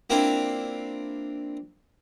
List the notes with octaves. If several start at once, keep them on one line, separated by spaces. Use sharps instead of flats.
A#3 C4 D4 E4 F4